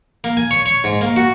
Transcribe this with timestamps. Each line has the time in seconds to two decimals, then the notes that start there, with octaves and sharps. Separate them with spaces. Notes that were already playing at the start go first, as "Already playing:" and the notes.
0.24 A#3
0.37 G#5
0.51 C#5
0.66 C#5
0.84 G#2
1.01 A#3
1.16 F#4